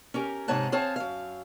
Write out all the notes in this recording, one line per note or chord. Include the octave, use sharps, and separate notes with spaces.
C#4 G4 A#4
G#2 C3 D#4 C#5 F#5 A5
C4 G#4 C#5 F5 A5
F#2 F5